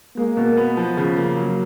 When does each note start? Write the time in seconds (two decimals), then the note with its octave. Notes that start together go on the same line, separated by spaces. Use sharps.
0.17 G#3 A#3
0.37 B2
0.57 B3
0.77 F3
0.97 C#3
1.17 A#3
1.36 F#3